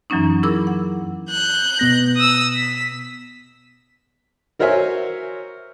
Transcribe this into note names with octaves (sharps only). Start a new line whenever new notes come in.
F#2 E3 F#3 A#3 C#4 D#4
E4 G#4 A#4 B5 D6 E6
F#5
F#6 G6
B2 B3 A#6
D#6 E6
B6
F#4 A#4 C5 C#5 E5 G#5